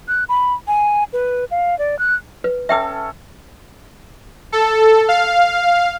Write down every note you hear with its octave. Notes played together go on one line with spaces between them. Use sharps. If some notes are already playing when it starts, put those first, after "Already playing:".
F#6
B5
G#5
B4
F5
D5
F#6
B4
C#4 A4 E5 G5 D#6
A4
F5